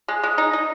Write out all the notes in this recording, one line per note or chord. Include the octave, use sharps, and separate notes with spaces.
G#3
G#3
D#4
D#4